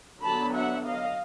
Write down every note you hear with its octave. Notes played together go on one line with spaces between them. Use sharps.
D3 F#3 B3 D4 A5 B5
E5 F#5
D#5 F5